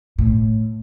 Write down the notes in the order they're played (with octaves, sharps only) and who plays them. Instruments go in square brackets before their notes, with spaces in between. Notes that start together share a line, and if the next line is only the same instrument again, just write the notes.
[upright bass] A2